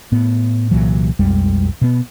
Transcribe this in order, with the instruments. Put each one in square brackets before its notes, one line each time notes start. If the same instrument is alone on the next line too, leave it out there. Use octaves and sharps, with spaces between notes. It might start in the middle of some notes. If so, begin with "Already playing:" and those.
[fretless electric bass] A2 B3
C2 A#2 E3 F#3
B1 F2 G3 G#3
B2 B3